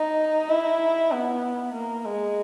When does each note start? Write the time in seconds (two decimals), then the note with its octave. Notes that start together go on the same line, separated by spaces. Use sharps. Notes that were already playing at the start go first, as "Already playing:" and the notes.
Already playing: D#4
0.50 E4
1.12 B3
1.74 A#3
2.05 G#3